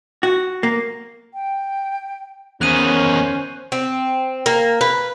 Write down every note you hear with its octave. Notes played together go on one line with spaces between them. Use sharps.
F#4
A#3
G5
E2 D#3 C#4 C5 F#6 D#7
C4
A#3
B4